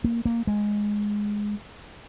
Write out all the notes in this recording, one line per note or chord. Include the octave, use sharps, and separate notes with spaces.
A#3
A#3
G#3